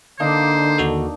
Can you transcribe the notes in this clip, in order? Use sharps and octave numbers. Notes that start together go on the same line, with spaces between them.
D3 A#3 D4 D#4 C5
D#2 F#4 A4